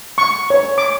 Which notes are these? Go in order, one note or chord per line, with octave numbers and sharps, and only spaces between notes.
C#6
C#5
D6